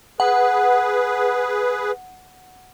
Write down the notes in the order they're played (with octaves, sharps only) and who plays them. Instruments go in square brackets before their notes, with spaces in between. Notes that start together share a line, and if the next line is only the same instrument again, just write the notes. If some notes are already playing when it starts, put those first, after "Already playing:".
[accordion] G#4 B4 [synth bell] F#5